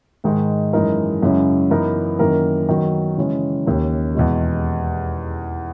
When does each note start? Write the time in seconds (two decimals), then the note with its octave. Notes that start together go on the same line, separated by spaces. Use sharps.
0.24 G#2 D#3 G#3 D#4
0.73 F#2 E3 G#3 D#4 A#4
1.23 F#2 C#3 G#3 C#4 E4
1.71 F#2 E3 B3 D#4 A#4
2.19 F#2 D#3 A#3 E4 A#4
2.69 D#3 F#3 B3
3.17 C#3 E3 G#3 C#4
3.66 D#2 D#3 A#3 C#4
4.15 E2 B2 G#3